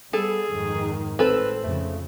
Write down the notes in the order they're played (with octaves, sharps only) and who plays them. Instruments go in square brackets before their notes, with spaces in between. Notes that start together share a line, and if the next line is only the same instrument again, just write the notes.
[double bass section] G3 B3 [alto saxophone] G#4 [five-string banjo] A4
[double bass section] F2 G#2 D#3
[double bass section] G#1 A2 [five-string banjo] C4 A4 [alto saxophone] B4
[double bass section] F2 C#3 [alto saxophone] A3